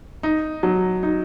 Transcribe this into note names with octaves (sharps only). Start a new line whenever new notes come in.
D#4
F#3
D#4